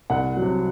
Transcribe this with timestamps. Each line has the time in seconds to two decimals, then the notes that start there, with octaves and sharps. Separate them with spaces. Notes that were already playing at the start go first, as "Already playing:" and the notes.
0.10 C2 F#5
0.37 F#3
0.42 C3